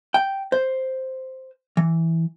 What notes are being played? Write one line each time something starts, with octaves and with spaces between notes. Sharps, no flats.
G5
C5
E3